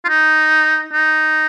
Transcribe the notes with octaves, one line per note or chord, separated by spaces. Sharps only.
F4
D#4
D#4